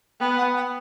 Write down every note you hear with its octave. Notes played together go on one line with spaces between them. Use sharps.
B3 G5
F#5
G5